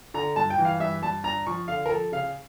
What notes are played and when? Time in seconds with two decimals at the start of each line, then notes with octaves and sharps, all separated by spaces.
0.14 D3 A#5
0.36 G2 A5
0.50 G5
0.58 E3
0.65 F5
0.80 G2 E5
1.02 G2 A5
1.24 D4 A#5
1.47 F3 C#6
1.68 D3 F5
1.86 A#4
1.90 F3 A4
2.12 C#3 F5